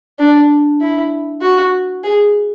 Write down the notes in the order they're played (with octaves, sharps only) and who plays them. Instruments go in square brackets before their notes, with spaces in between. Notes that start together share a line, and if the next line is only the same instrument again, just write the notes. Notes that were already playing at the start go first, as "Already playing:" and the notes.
[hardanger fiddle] D4
E4
F#4
G#4